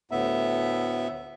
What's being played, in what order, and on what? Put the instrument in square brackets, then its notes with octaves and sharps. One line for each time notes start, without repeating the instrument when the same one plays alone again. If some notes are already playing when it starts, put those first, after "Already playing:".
[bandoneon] D2 A2 B3 E5